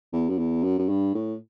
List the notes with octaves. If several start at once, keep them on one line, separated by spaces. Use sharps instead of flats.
E2
F#2
E2
F#2
F#2
G2
A2